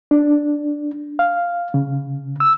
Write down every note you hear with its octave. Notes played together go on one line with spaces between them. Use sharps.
D4
F5
C#3
E6